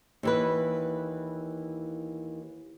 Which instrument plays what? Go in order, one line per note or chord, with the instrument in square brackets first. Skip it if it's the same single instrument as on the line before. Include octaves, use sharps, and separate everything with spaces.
[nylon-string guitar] D#2 E3 B4